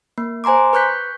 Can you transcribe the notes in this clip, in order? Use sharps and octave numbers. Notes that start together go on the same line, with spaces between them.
A#3
C5 G#5 A#5 C6 D6
B4 C#6 F#6 G6 B6